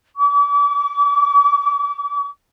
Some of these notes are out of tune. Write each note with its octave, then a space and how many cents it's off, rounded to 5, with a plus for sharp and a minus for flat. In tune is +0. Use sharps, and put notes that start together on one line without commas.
D6 -40